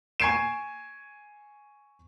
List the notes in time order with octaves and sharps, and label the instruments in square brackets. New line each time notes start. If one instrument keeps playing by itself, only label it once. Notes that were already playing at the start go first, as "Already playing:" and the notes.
[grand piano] G#5 C#6 G#6 C7 D7 E7